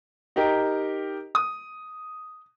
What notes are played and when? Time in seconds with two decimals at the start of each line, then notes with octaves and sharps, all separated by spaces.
0.36 D#4 G4 A#4
1.35 D#6